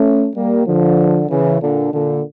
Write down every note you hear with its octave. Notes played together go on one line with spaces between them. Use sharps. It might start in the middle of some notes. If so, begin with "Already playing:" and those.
Already playing: A3 C#4
G3 A#3
D3 F3
C#3 E3
A#2 D3
A#2 D3